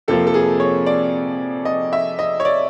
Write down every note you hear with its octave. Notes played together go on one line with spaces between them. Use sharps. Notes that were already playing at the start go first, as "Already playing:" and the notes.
F2 C3 F3 A#3 A4
A4
G#4
C#5
D5
D#5
E5
D#5
C#5
D5